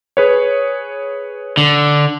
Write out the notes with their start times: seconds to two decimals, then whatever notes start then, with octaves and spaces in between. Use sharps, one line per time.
0.17 G#4 B4 C#5
1.57 D3